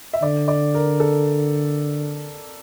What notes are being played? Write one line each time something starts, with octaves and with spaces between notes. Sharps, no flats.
E5
D3 D5
D5
A#4
A4